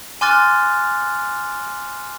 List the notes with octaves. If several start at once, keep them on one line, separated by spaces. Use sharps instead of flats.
G#5 C6 D6 F6 F#6 A6